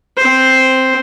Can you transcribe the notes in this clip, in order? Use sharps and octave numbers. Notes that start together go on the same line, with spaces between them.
C4 C5